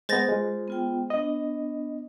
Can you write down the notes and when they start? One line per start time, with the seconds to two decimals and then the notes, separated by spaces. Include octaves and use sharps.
0.09 G#3 B3 C5 A6 A#6
0.29 G#3 F4
0.68 B3 F4 G5
1.10 B3 D4 D#5